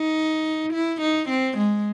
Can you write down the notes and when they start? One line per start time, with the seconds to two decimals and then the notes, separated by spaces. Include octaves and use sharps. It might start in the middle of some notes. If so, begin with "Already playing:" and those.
Already playing: D#4
0.73 E4
1.02 D#4
1.29 C4
1.57 G#3